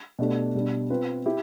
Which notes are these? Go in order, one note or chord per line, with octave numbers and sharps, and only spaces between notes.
B2 A3 D4 G4
B2 G3 D4
C4 F4 B4
E4 G4